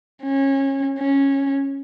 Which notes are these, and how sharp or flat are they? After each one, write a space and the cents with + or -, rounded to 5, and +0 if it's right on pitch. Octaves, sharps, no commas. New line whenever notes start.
C#4 -25
C#4 -10